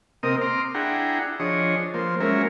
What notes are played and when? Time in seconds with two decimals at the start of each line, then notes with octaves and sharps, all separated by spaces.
0.23 C3 A#3 C4 A#4 D#5 D#6
0.41 A#5 C6 D6 F6
0.75 D4 E4 G#4 F#5 G5 A#5
1.40 F3 D4 G#4 C#5 D#5
1.94 F3 A#3 C5
2.20 F#3 G#3 A#3 C#4 A#4 E5